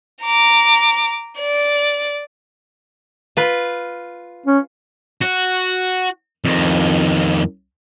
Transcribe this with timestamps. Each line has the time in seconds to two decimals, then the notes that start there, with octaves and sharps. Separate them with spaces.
0.23 A#5 D6
1.40 D5
3.37 F4 B4
4.46 C#4
5.22 F#4
6.45 F2 D#3